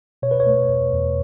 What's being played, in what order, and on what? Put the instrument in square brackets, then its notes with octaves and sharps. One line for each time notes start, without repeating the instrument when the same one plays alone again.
[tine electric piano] B2 C#5
B4
C#5
A3
E2
E2